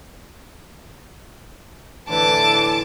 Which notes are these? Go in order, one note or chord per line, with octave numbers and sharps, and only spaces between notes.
A2 D3 E3 A5 D6